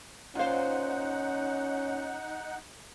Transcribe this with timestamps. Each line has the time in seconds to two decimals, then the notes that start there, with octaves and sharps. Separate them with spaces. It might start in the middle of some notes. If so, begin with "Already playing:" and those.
0.35 A#2 C#4 D#4 F4 C5 F5 F#5